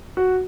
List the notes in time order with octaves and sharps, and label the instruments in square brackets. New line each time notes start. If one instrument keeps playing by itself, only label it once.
[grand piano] F#4